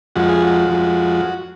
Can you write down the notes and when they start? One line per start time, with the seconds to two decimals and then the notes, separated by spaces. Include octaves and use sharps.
0.16 F2 F3 G#3 F#4
0.29 G#4
0.42 F#4
0.69 F2 F3 G#3